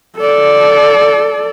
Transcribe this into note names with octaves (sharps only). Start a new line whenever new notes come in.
A4 D5